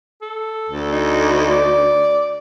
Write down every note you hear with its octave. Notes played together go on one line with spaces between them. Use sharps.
A4
D2
D#4
D5